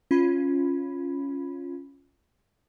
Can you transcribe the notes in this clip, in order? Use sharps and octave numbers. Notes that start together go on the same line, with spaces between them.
C#4 F4 B5